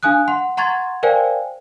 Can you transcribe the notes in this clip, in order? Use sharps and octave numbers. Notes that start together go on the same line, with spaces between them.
D4 F5 G#5 D#6 F#6
F#5 C6
F#5 A#5 C6 C#6 G#6 A6
A#4 C5 D5 F5 G5 G#5